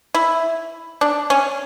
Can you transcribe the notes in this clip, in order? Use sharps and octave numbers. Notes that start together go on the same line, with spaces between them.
E4
D4
C#4